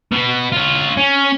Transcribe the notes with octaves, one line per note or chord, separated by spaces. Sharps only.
B2 B3
F4 C#5
C#4